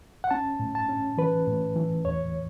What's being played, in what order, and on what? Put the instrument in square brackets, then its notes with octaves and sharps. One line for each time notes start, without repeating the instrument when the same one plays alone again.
[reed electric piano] F#5
C#4 A5
A2
A5
C#4
E3 B4
A2
E3
E2 C#5